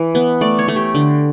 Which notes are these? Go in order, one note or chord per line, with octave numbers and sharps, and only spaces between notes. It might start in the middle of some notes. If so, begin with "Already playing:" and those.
Already playing: E3
B3
A3 D5
C#5
A3
G4
D3